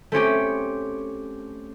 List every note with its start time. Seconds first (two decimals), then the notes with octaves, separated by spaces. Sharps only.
0.12 A3 C4 C#4 G4